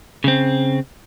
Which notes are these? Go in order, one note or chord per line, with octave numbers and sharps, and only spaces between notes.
C#3 C4